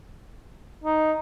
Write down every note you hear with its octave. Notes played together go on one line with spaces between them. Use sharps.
D#4